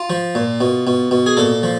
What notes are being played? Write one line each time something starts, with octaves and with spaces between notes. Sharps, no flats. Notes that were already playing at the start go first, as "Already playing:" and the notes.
Already playing: F4
F3
A#2
B2
B2
B2
G#4
A#2 A4
F3